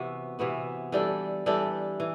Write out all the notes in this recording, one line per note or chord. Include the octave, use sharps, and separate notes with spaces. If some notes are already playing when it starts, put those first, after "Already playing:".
Already playing: C3 E3 B3 F#4
C3 E3 B3 F#4
E3 G3 D4 A4
E3 G3 D4 A4
E3